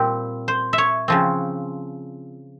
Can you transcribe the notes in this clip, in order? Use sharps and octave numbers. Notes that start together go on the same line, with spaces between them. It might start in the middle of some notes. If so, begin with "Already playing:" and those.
Already playing: A#2 G3 C4 G4
C5
E5
C#5
C#3 F3 C4